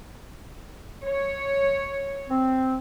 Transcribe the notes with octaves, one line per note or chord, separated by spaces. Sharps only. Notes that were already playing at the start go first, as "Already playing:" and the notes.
C#5
C4